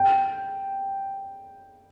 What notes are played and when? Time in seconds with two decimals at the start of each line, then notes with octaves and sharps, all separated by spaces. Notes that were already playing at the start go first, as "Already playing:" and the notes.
Already playing: G5